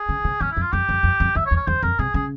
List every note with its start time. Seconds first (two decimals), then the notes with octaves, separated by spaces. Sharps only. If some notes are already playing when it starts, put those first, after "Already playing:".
Already playing: G#4
0.09 C#3
0.24 C3
0.41 E2 C#4
0.51 E4
0.57 F2
0.62 F4
0.72 F2 G4
0.89 F2
1.03 F2
1.20 F2
1.36 E2 E5
1.46 C#5
1.51 E2
1.56 C#5
1.67 E2 C5
1.82 F2 A#4
1.99 C3 G#4
2.14 C#3 G#4